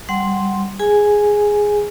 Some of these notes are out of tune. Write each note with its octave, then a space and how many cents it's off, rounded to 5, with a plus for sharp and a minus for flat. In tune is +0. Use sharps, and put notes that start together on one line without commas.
G3 +0 F#5 +0 C6 +0
G#4 +0 G#5 +0